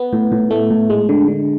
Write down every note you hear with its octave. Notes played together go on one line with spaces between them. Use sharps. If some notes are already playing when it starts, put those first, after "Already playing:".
Already playing: B3
A2
A2
A3
A2
G#3
D3
D3